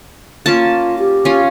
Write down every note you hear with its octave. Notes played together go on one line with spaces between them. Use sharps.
A#3 C#4 F4 A5
G4
C#4 F4